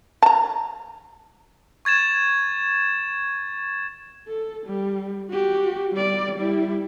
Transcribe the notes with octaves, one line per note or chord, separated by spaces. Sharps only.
A5 A#5
C#6 G#6 A6 E7
A4
G3
F#4 G4
G3 D5
G3 E4